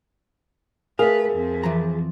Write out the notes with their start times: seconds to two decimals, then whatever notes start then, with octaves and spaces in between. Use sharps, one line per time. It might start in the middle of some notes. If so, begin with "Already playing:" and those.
0.99 A3 G#4 A#4 B4 E5 F5
1.31 F2 C4
1.63 E3 F3 A#5